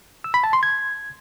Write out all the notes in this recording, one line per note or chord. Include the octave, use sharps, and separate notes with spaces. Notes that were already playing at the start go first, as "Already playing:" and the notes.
E6
B5
A5
C6
G#6